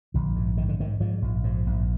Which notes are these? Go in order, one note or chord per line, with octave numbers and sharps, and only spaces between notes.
A#1 D3
G#2
G#2 D#3
D3
G#2 D#3
G#2 F3
A#1
G#2 F3
A#1